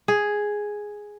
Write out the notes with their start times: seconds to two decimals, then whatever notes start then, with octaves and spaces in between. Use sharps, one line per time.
0.08 G#4